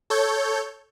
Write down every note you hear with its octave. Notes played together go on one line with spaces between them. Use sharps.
A4 C#5 G6